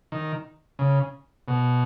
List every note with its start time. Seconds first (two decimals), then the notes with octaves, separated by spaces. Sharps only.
0.12 D#3
0.79 C#3
1.48 B2